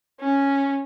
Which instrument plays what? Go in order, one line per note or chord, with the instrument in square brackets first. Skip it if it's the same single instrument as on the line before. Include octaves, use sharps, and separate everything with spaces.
[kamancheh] C#4